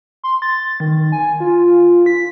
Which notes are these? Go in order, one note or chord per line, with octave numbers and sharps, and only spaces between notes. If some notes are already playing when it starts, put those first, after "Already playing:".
C6
A6
D#3
G#5
F4
B6